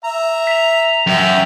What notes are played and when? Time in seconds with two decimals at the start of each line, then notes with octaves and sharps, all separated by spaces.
0.05 E5 A#5
0.47 B6 F7
1.07 F#2 E5 G5